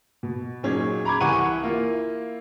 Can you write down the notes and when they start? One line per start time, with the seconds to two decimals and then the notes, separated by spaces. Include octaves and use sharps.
0.23 B2
0.63 A#2 F#3 C#4 D#4 G#4 G#6
1.05 A#5 B5 D6 G#6
1.21 C2 E3 F#5 C#6 D#7
1.63 A#3 E4 F4